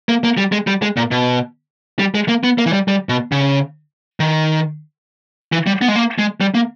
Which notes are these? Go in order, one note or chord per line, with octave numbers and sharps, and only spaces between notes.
A#3
A#3
G3
G#3
G3
G#3
A#2
B2
G3
G#3
A#3
B3
A#3
E3
G3
G3
B2
C#3
D#3
E3
G3
B3
G#3
A#3
G#3
G3
A#3